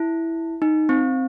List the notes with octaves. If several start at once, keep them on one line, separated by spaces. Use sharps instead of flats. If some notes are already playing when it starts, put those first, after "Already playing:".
Already playing: E4
D#4
C4